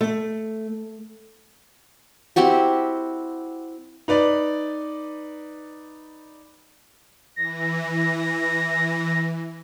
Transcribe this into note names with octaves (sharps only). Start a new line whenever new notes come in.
A3
C4 E4 F#4 G4
D#4 B4 D5
E3 A#6